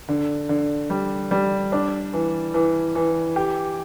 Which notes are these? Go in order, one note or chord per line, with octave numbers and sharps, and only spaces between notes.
D3
D3
G3
G3
D4
E3
E3
E3
G4